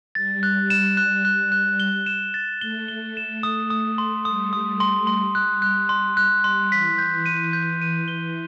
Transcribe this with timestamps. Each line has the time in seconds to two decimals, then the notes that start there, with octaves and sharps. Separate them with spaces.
0.15 G3 A6
0.43 F#6
0.70 E7
0.97 F#6
1.25 F#6
1.52 F#6
1.80 G7
2.06 E7
2.34 A6
2.61 A3 G7
2.88 G7
3.17 E7
3.43 D#6
3.70 D#6
3.98 C6
4.25 G3 D#6
4.53 D#6
4.80 C6
5.07 G3 C6
5.35 F#6
5.62 F#6
5.89 C6
6.17 F#6
6.44 C6
6.72 E3 B6
6.98 G6
7.26 D#7
7.53 G6
7.81 D#7
8.08 G7